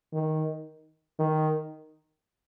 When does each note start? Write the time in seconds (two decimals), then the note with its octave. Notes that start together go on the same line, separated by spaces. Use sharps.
0.13 D#3
1.20 D#3